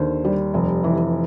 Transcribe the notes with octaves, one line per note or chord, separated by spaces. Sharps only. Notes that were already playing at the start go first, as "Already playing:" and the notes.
Already playing: D#2 D3 C5
G3
F1
E3